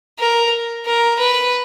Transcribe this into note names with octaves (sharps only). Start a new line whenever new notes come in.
A#4
A#4
B4